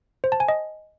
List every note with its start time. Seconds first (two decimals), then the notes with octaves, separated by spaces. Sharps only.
0.24 C5
0.32 A5
0.40 G#5
0.48 D#5